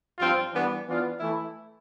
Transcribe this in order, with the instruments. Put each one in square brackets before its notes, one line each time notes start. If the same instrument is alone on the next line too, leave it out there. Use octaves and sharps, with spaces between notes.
[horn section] G2 F3 C4 F4
E3 G3 B3 D4
E3 B3 D4 F4
E3 A3 E4